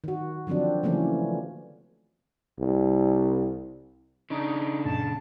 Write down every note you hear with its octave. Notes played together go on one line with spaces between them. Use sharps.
D#3 F#4
D3 F3 F#3 C4 D4
C#3 E3 F3 A3 A#3 C#4
C2
C#3 D4 D#4
F#2 A#2 A5